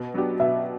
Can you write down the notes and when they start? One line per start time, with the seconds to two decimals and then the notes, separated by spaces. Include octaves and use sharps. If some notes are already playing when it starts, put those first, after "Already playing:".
Already playing: B2
0.14 F#3 B3 D4 G4
0.40 B2 E5